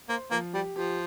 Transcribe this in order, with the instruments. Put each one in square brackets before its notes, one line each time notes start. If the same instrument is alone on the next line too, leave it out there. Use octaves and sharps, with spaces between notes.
[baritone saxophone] A#3 [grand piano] C5
[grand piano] F3 [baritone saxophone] A#3
[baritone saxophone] G3 [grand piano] G4
[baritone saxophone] F3 [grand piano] G4